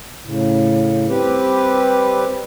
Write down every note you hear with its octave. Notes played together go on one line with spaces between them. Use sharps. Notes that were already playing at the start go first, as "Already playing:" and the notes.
A2 C#3
G3 C4 G4 B4